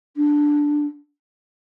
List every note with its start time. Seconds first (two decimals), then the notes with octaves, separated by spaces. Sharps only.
0.16 D4